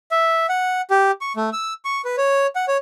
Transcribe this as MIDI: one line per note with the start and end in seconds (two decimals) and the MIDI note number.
0.12 0.46 76
0.49 0.81 78
0.91 1.11 67
1.21 1.33 85
1.37 1.50 57
1.53 1.74 88
1.85 2.02 85
2.05 2.16 71
2.18 2.47 73
2.56 2.66 78
2.68 2.77 73